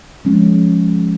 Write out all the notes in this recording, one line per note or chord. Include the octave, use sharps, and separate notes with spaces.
F3 G#3 C#4